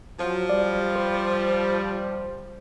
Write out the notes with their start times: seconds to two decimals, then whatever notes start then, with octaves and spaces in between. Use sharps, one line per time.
0.20 F3 F#3
0.49 G3 D5
0.96 C5